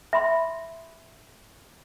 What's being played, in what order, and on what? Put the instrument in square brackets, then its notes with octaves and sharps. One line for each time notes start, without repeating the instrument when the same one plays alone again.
[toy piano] E5 B5 C6